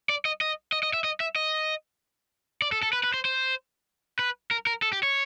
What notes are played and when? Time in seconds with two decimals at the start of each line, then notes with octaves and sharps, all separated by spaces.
0.09 D5
0.25 D#5
0.41 D#5
0.72 D#5
0.83 D#5
0.94 E5
1.04 D#5
1.20 E5
1.36 D#5
2.62 D5
2.72 A4
2.83 A4
2.93 B4
3.04 B4
3.14 C5
3.25 C5
4.19 B4
4.51 A#4
4.67 A#4
4.82 A4
4.93 G4
5.03 C#5